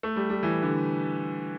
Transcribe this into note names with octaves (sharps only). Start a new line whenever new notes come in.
A3
G3
G3
E3
D3